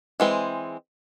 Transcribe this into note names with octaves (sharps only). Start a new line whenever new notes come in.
E3 G#3 C4